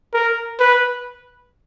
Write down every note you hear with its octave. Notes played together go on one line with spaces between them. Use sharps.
A#4
B4